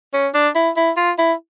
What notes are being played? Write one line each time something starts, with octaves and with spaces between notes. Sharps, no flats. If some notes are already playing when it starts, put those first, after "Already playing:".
C#4
D4
E4
E4
F4
E4